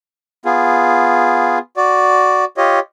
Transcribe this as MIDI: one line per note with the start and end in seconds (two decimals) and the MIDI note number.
0.45 1.58 59
0.45 1.58 65
0.45 1.58 68
1.77 2.45 66
1.77 2.45 74
2.57 2.79 65
2.57 2.79 67
2.57 2.79 73
2.57 2.79 75